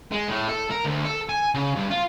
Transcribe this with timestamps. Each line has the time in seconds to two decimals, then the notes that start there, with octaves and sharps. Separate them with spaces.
0.12 G#3
0.28 A2
0.49 A4
0.71 A#4
0.85 D2
1.05 A4
1.29 G#5
1.54 C#3
1.75 G2
1.90 F4